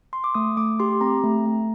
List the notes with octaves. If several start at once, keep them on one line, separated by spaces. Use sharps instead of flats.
C6
D6
A3 D#6
A3 D6
G4 C6
C4 A#5
A3
A3